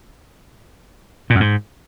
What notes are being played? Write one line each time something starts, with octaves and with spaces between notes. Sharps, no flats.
A#2
F#2
G#2